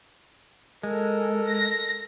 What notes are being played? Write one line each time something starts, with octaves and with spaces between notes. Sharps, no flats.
G#3 A4 A#4
A#6